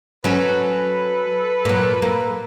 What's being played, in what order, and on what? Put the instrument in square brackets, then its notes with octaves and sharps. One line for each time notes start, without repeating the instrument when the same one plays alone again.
[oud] F#3 C#4 [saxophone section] A4 B4
[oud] A#2 F#3
A#3